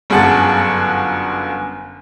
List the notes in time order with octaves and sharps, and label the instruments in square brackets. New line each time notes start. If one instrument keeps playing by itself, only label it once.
[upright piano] G1 F#2 G#4 F#5 A5 A6